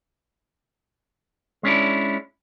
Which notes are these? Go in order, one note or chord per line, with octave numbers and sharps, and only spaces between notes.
G#3 C#4 D4 E4